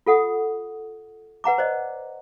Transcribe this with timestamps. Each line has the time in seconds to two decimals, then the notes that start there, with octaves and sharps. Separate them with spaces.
0.06 F4 A4 F#5 D#6
1.44 B4 F#5 A#5 D6
1.58 C5 D5 D#5